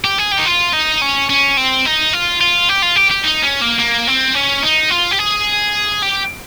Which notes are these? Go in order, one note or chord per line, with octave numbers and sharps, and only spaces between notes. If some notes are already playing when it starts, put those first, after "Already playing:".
G4
G#4
G4
D#4
F4
D#4
C#4
C#4
C4
D#4
F4
F4
G4
F4
G4
G4
D#4
C#4
A#3
A#3
C4
C#4
D#4
F4
G4
G#4
G4